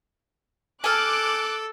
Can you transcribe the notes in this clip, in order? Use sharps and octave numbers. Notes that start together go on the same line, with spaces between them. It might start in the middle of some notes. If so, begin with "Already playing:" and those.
A4 G#5 D6 F6 F#6